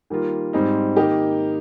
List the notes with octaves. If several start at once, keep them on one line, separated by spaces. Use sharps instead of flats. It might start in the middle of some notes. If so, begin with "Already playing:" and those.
D#3 G3 A#3 F4
G#2 G3 C4 D#4
D#3 A#3 D#4 G4